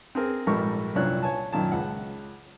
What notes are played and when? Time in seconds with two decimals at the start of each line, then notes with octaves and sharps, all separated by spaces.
0.15 C4 G#4 A#4
0.47 A#1 G#2 G3 A4 A#4 C#6
0.95 C2 F#2 A#2 D4 C#5 F#6
1.22 C#5 G#5 A5
1.52 F#2 A#2 D#3 A5
1.72 C#2 F#5 A5